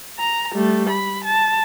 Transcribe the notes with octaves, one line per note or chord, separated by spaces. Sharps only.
A#5
G3 A3
B5
A5